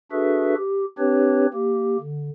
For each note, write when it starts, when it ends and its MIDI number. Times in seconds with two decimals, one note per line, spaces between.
0.12 0.55 62
0.12 0.55 66
0.12 0.55 68
0.12 0.55 69
0.12 0.55 71
0.12 0.55 76
0.58 0.85 67
0.98 1.46 60
0.98 1.46 62
0.98 1.46 67
0.98 1.46 71
0.98 1.46 73
1.54 1.97 58
1.54 1.97 67
2.00 2.30 50